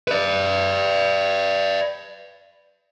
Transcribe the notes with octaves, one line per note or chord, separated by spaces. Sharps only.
B4 D5